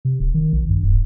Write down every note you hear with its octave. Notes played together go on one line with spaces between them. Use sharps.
C3
D1
D#3
A#1
G2
D1